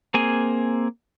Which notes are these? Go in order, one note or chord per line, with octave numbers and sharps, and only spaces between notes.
A#3 C4 G#4 G#5